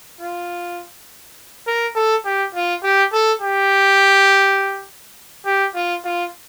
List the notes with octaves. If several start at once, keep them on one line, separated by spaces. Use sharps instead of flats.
F4
A#4
A4
G4
F4
G4
A4
G4
G4
F4
F4